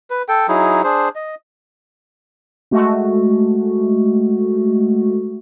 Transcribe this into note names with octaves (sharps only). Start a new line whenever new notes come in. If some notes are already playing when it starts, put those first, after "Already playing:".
B4
A4 G5
F#3 D#4 E4 G#4
D4 G#4 C5
D#5
G#3 A3 F#4